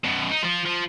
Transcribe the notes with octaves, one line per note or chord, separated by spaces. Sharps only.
F#2 B2
D#4
F3 F4
F3